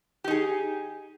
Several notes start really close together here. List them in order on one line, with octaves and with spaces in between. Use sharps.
G4 D#4 G#4